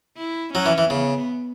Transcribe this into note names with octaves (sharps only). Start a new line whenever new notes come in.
E4
F#3 C#4
E3
E3
C#3 B3